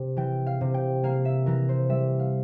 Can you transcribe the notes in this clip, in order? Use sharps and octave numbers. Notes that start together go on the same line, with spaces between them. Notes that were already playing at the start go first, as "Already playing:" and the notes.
Already playing: C3
E3 G5
F5
C3
G5
A#3 F5
E5
E3 A#4
C5
G3 E5
F5